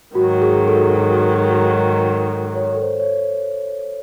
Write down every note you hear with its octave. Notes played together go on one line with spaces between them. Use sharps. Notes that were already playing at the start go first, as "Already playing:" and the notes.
G#2 D#3 F#3 F#4
G#4
A4
C#5
A4
C5
C#5